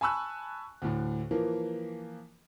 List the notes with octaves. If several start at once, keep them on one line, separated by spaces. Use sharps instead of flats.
G#5 A5 B5 C#6 E6 F#6
D2 A2
E3 F3 A#3